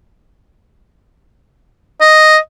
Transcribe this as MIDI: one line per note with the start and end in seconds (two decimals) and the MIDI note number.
2.01 2.37 75